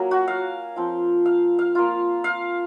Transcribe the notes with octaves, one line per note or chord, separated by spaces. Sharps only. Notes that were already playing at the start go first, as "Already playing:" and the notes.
Already playing: F#3 A#3 C#4
F#4
F5
F3 C4 F4
F5
F5
A#3 F4
F5